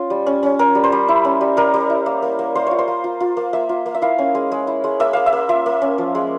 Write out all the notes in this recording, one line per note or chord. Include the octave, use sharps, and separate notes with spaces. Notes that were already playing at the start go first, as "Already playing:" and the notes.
Already playing: C#4 F4
G3
C#4
C#4
C#4 A#4
G3
C5
G3
E4
C#4
G3
G3 A#4
G3
E4
A#3
A#3
A#3
A#3 C5
F4 C#5
C5
A#3
F4
F4
A#3
A#3 E5
F4
A#3
E5
E4 F5
C#4
G#3
G#3
E4
G#3
A#3 E5
A#3 F5
E5
A#3
F4 E5
A#3
C#4
F3
G#3